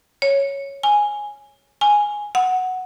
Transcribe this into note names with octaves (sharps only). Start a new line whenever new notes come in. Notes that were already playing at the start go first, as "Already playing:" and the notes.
C#5
G#5
G#5
F#5